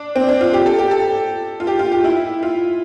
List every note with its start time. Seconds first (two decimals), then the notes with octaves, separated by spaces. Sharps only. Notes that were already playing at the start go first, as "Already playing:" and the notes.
Already playing: D4
0.16 C4
0.29 D4
0.41 F4
0.53 G4
0.66 A4
0.79 G4
0.91 A4
1.60 F4
1.67 G4
1.79 F4
1.92 G4
2.04 E4
2.43 F4